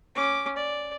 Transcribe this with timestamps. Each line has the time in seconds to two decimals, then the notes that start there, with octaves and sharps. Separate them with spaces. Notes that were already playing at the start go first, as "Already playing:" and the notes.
0.15 C#4 D6
0.56 D5